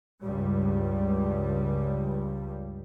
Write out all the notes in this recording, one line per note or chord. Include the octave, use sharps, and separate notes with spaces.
C#2 G2 G3